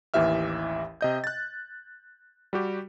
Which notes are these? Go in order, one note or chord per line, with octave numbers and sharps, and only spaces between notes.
A1 D#2 E3 G4 E5 F6
C3 D#5 G6
F#6 A6
G3 F#4 G4